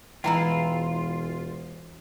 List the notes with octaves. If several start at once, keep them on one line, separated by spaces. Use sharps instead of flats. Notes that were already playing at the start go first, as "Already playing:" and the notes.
E1 E3 G#3 E4 F4 G5 A#5 B5